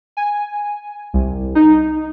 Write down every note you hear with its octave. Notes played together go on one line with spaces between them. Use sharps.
G#5
C2
D#4